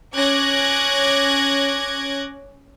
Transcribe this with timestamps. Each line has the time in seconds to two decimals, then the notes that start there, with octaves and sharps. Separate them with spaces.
0.15 C#4 D6 F#6 G#6 A#6